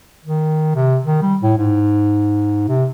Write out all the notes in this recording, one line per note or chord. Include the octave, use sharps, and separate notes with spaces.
D#3
C3
D#3
G3
A2
G#2
C3